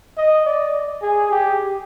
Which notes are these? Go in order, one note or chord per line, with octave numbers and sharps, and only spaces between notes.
D#5
D5
G#4
G4